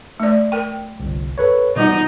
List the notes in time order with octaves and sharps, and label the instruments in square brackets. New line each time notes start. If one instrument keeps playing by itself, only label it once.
[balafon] A3 D5
A#4 G5
[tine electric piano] G1 C2
A4 B4 C#5
[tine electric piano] B2 F#5 [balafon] E3 G3 [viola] D#4